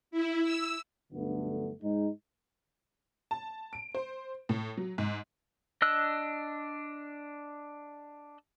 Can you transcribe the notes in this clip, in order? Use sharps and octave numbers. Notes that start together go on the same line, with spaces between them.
E4
E6
B1 G2 D3 A3 B3
G#2 G#3 D#4
A5
D7
C5
A2
F#3
G#2
D4 D#5 E6 F#6